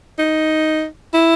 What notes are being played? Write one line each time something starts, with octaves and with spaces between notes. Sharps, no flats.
D#4
E4